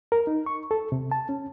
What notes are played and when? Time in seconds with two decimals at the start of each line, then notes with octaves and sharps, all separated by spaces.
0.12 A#4
0.27 D#4
0.46 C#6
0.71 A4
0.92 C3
1.12 A5
1.29 C#4